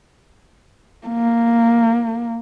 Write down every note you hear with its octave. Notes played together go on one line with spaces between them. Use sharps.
A#3